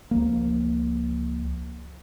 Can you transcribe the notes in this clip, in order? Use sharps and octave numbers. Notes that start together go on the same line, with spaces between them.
C#2 F3 A#3